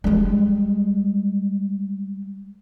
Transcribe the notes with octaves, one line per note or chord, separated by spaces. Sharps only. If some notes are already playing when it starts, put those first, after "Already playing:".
G3 G#3